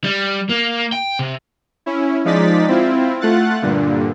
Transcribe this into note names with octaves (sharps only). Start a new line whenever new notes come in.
G3
A#3
G5
C3
C#4 E4
F3 G#3 D#4 D5 A6 B6
C4 E4 F4
A3 F4 F#5 F#6 A6
G2 A#2 D3